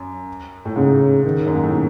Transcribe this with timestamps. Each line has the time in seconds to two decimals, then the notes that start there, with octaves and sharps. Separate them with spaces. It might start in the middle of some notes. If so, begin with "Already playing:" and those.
Already playing: F#2
0.65 A2
0.76 G#2 C#3
1.24 D#3
1.46 F#2
1.55 G#2
1.63 A2
1.73 B2